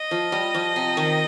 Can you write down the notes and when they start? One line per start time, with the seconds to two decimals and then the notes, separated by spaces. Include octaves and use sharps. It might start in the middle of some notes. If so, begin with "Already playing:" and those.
Already playing: D#5
0.11 F3
0.32 G3
0.54 F3
0.76 C3
0.97 D#3